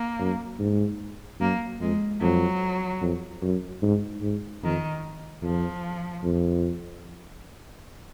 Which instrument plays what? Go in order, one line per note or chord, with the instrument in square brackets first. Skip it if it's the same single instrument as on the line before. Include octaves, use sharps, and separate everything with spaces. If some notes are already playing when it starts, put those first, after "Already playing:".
Already playing: [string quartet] A#3
[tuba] F#2
G#2
[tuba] F#2 [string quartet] A#3
[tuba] F2 [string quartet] G#3
[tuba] F2 [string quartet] F#3
[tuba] F2
F#2
G#2
G#2
[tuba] F2 [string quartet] D#3
[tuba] F2 [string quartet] F3
[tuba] F2